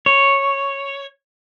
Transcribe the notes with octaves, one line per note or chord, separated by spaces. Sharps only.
C#5